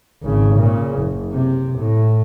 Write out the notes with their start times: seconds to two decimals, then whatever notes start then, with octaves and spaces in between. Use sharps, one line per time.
0.23 G#1 C#3
0.56 A#2 C#3
0.99 F#1
1.32 C3
1.79 A2